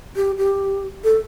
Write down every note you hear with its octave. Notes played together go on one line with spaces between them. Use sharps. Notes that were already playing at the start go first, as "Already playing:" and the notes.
G4
G4
A4